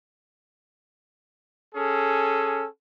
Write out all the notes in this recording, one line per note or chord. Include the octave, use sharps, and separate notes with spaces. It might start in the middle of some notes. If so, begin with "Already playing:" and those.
C#4 G#4 A4